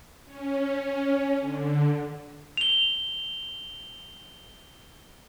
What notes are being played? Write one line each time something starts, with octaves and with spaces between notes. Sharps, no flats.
C#4
D3
F7 G7